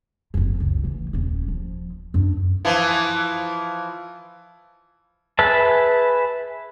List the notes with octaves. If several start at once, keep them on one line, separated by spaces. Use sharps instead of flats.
F#1 F2
C#2
E3 A3
D#1 C#4
F3
F#2 D4
E3 F3
G#4 B4 E5 A5